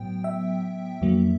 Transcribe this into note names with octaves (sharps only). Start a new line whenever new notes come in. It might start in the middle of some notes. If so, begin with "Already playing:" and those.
Already playing: A2 F#3 B3 G5
E5
F2 D3 F#3 A#3